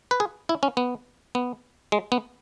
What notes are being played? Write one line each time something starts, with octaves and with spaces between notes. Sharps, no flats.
B4
G#4
E4
C#4
B3
B3
G#3
B3